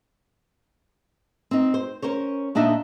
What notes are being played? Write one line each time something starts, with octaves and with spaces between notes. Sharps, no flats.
C4 D#4
C5
C#4 A#4 C5 C#5
A#2 D4 D#4 D#5 E5